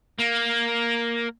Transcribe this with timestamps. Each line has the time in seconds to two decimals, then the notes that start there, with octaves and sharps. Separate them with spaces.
0.19 A#3